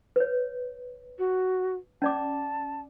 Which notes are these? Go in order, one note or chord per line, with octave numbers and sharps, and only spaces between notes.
B4 C#5
F#4
C#4 D5 A5 D6